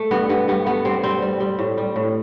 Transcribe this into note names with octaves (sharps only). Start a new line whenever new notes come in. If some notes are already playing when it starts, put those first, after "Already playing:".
Already playing: A3
G2 B3
G2 B3
G2 B3
A3 B3
G2 C4
G3 C4
G3
G3
A2
G3
A2